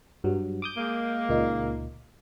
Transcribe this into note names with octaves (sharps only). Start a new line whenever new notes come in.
G2 F#3
D6 D#6 G6
G#3 A#3
C#2 A#2 D#4